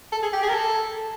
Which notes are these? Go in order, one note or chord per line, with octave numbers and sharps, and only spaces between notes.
A4
G#4
G4
G#4
A#4
A4